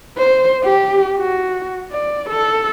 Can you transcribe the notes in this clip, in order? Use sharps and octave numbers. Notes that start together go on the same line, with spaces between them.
C5
G4
F#4
D5
A4